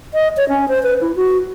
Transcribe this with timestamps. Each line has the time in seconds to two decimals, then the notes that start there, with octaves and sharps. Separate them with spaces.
0.14 D#5
0.37 C#5
0.49 C#4
0.68 C5
0.83 B4
1.01 E4
1.16 F#4